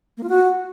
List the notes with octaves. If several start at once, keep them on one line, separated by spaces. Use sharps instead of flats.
A#3
F4
F#4